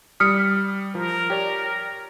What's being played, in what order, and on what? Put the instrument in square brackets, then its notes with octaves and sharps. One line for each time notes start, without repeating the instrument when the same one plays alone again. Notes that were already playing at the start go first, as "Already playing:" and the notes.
[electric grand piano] G3 B6 [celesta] D#6 F6 C#7
[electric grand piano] F3 [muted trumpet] A#4
[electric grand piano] G4 C#5 D5